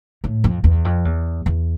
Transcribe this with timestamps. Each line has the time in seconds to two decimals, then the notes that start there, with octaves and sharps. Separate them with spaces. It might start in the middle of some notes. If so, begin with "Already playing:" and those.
0.24 A2
0.44 F2
0.64 E2
0.85 F2
1.05 E2
1.46 E2